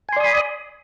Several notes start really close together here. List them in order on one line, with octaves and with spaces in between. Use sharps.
G#5 C6 D5 D#6 B5